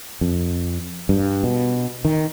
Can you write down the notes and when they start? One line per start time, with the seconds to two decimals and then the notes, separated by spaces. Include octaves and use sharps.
0.21 F2
1.09 G2
1.43 B2
2.05 D#3